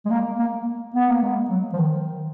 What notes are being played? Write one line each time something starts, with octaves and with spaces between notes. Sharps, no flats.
G#3
A#3
A#3
B3
A#3
G#3
F#3
F3
D#3